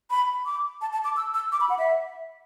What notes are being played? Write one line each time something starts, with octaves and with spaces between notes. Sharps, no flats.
B5
D6
A5
A5
D6
E6
E6
D6
B5
F#5
E5